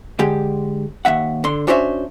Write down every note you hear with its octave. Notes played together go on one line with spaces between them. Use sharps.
D3 G#3 G4
D#2 F#3 E5 F#5
D3 C6
C#4 D4 F#4 C5 C#5 E5